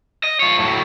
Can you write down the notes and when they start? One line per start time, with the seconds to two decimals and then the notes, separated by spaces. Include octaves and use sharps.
0.24 D#5
0.40 F4 C#5
0.59 A2 F#3